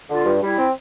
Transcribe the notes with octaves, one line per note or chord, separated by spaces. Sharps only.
D3 F4
G2
G3 E4
C4